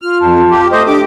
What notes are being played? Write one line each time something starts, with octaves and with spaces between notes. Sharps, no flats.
F4 F6
F2 A5
G4
A3 C5 D#5
D4 G4 D6